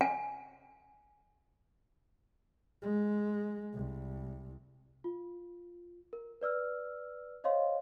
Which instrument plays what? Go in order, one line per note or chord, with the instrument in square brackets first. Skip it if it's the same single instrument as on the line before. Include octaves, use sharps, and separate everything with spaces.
[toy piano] G#5
[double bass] G#3
C2
[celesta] F4
A#4
B4 D5 E6 F6
C5 C#5 D#5 F5 C6